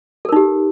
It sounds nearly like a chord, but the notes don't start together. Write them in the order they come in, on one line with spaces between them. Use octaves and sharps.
A4 A#4 D#4 G4